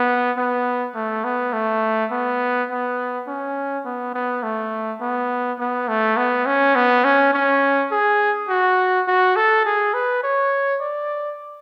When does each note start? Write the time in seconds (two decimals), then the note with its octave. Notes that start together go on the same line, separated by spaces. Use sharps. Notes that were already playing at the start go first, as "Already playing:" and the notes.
Already playing: B3
0.38 B3
0.95 A3
1.24 B3
1.53 A3
2.12 B3
2.70 B3
3.28 C#4
3.85 B3
4.14 B3
4.43 A3
5.01 B3
5.59 B3
5.88 A3
6.17 B3
6.46 C#4
6.75 B3
7.05 C#4
7.33 C#4
7.92 G#4
8.49 F#4
9.08 F#4
9.36 A4
9.65 G#4
9.94 B4
10.24 C#5
10.81 D5